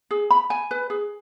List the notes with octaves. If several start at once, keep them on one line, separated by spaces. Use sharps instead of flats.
G#4
B5
G#5
B4
G#4